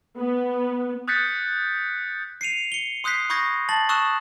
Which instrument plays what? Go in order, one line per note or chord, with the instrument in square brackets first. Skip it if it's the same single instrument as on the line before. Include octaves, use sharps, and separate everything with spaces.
[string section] B3
[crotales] D#6 F#6 G6 A6 B6 C#7
[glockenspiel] C7 C#7 D#7 F7
C#7 G7
C6 D#6 F#6 G6 B6 C7
B5 C#6 D#6 G6 G#6 A#6
A5 A6 F#7
A5 C#6 D#6 E6 F#6 E7